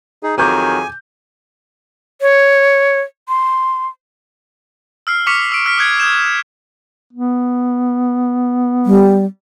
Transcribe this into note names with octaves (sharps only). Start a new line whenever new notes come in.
D#4 G#4
F2 D#3 F#3 G#4 G#5 D6 G6
C#5
C6
E6 F6 C7
C#6 D6 F6 B6 C#7 F7
E6 D7
E6 F6 B6
D#6 F#6 G#6 C#7
D#6 G6 G#6 E7
B3
G3